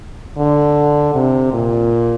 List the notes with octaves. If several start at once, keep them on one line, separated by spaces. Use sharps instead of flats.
D3
C3
A#2